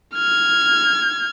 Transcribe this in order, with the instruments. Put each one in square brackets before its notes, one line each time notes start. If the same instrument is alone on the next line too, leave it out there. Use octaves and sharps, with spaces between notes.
[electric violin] F6 G#6